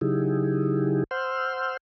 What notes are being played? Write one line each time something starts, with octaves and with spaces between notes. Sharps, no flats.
C#3 F#3 D#4 E4 G4 G#4
C5 F#5 C6 E6 F6 G6